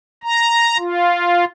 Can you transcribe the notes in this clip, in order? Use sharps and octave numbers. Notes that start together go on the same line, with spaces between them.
A#5
F4